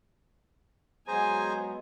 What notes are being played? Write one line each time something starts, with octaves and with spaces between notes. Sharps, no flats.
F#3 G#3 B3 G#4 C5 G#5 A#5